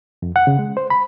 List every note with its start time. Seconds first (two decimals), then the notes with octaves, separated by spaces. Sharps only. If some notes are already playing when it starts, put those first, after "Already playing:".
0.22 F2
0.36 F#5
0.47 C#3
0.59 G#3
0.77 C5
0.90 B5